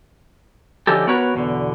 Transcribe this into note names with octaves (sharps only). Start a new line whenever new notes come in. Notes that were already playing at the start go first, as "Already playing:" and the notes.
D3 F3 C#4 D#4 G4 A4
B3 F#4 A#4 B4 C#5
E2 B2 D3